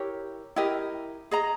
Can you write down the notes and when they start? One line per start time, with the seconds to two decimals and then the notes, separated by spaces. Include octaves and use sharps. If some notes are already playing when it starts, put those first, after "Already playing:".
Already playing: E4 G4 A#4 C#5
0.56 E4 G4 A#4 D#5
1.31 G#4 D#5 A#5